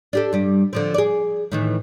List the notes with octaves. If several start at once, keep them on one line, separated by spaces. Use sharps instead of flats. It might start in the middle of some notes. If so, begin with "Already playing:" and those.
D4 G4 A4
G2 G3
D3 F3 C4
G#4 D5
A2 D#3 E3